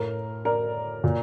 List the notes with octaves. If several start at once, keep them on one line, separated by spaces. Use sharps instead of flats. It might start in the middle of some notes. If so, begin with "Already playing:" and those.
Already playing: A2 A#4
A#4 D5
A#2